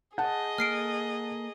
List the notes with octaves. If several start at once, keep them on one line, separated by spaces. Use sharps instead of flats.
G#4 D#5 F#5 A5 G6
A#3 A4 F6 C7 D7